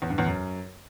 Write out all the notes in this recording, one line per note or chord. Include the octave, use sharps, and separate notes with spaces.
E2
G2
E2
F#2